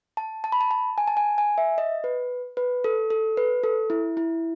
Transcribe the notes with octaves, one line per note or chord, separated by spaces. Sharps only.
A5
A5
B5
A5
A5
G#5
A5
G#5
G#5
E5
D#5
B4
B4
A4
A4
B4
A4
E4
E4